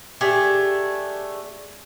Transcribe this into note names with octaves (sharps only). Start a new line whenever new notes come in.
A3 D4 G4 G#4